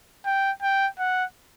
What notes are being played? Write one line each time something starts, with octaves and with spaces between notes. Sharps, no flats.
G5
G5
F#5